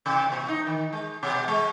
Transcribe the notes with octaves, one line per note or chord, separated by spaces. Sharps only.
C3
A#2
D#4
D#3
G#3
B2
G#3